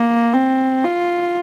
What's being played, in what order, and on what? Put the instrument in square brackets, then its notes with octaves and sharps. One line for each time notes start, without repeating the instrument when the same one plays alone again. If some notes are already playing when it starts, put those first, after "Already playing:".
Already playing: [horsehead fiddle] A#3
C4
F4